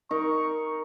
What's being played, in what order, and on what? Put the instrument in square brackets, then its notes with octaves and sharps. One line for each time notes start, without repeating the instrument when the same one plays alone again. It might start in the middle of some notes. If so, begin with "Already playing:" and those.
[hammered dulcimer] D#4 A#4 [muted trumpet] C#6